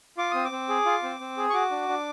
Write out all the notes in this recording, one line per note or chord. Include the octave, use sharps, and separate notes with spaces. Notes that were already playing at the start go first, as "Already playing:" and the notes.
F4 D6
C4 D#6
D6
C4
G#4
F4
C4
C4
G#4
C#6
F#4 D6
D4
D4